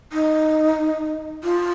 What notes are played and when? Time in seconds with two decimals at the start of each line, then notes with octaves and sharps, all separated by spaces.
0.13 D#4
1.43 F4